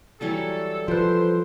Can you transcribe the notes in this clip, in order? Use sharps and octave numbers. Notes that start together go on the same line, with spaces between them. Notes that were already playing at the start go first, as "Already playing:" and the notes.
E3 F#3 G3 A4
F3 A4 B4 C5